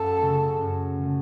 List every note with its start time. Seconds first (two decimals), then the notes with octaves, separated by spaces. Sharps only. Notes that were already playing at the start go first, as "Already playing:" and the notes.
Already playing: F#2 A4
0.19 C#3 A3
0.61 F#2
1.02 C#3 A3